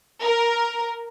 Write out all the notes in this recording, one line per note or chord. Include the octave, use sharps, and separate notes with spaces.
A#4